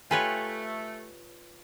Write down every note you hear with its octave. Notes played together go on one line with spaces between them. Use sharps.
A3 F4 G4 A4 B4 C#5 G#5